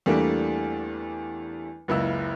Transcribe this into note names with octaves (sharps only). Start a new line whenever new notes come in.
E2 G3 A3 A#3 D4
F#1 C#2 E4 E6